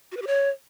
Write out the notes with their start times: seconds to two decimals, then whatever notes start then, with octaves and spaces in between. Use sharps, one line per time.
0.12 F#4
0.17 B4
0.22 G4
0.27 C#5